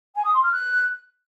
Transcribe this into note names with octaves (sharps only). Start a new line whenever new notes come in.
G#5
D#6
C6
F6
F#6